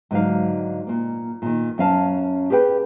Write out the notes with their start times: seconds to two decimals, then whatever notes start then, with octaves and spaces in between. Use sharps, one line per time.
0.11 G#2 D3 F#3 F5
0.87 A#2 A#3
1.42 A#2 D#3
1.78 F#2 C#4 F5 A5
2.50 G4 G#4 B4 E5 G5